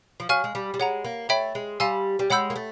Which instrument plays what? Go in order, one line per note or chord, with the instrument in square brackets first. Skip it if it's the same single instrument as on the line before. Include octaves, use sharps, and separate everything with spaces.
[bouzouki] F3
[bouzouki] F#3 [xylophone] F5 G#5 C#6 F6
[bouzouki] G#3
G3
G3
[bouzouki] G#3 [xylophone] C#5 F#5 A#5
[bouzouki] A#3
[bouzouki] A3 [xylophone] C#5 E5 G5 B5
[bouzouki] G#3
[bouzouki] G3 [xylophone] F5 G#5 C6 E6
[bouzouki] G3
[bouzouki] G#3 [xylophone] C#5 F#5 B5 E6 G6
[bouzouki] A#3
A3